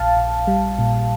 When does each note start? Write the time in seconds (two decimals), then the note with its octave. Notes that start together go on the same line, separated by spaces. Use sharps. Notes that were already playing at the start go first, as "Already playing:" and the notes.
Already playing: A#1 F5 A5
0.17 A#1
0.47 G3
0.79 A#2